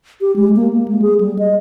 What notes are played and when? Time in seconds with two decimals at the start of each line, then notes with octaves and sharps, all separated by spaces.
0.21 G4
0.36 G#3
0.56 A#3
0.73 A#3
0.88 G#3
1.02 G#4
1.21 G3
1.39 D#5